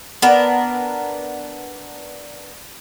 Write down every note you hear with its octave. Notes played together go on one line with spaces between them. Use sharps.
B3 D4 A#4